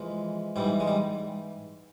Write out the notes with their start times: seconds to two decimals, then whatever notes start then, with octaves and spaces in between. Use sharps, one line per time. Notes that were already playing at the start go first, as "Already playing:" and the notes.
Already playing: F2 E3 G#3
0.56 G#2 E3 G3
0.80 G#3
0.88 G3